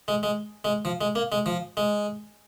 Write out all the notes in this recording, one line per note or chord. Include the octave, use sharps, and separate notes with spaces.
G#3
G#3
G#3
F3
G#3
A#3
G#3
F3
G#3